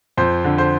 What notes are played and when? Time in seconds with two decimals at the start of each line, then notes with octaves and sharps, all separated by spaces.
0.17 F2 C5
0.44 D3
0.58 C5